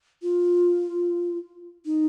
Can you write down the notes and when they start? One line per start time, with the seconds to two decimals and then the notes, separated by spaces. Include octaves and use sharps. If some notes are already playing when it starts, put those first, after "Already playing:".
0.23 F4
1.86 D#4